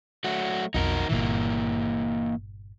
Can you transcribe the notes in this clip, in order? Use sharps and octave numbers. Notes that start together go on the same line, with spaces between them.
F#3 A3 F#4
B1 F2 D#4 F#4 A#4
G1 A#2 D3 E3 A#3